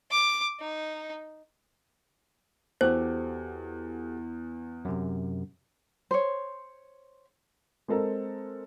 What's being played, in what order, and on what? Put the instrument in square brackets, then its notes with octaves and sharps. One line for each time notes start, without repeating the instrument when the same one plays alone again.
[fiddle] D6
D#4
[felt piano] E2 [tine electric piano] F#4 G4 A4 [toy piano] C5
[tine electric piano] F#2 C3
[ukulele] C5 C#5
[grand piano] G#3 C4 A4 A#4